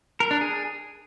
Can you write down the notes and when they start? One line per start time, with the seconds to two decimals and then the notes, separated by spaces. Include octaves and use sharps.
0.20 A#4
0.31 D4
0.41 G#4